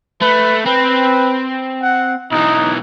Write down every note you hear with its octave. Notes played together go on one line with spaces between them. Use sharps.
A3 B4
C4 B4
F#5
B1 E3 D#4